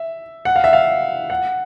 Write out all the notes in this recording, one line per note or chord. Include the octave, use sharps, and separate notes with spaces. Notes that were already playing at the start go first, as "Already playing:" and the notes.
Already playing: E5
F#5
F5
E5
F5
F#5